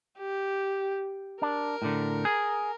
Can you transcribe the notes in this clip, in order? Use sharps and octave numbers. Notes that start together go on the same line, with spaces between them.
G4
D4 A#4
A2 D3
G#4